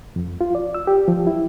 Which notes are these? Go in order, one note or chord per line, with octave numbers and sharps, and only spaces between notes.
F2
F4
D5
E6
G4
F3
E4